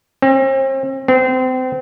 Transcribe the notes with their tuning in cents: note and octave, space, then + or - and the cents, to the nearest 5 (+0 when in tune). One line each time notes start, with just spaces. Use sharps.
C4 +40
C4 -30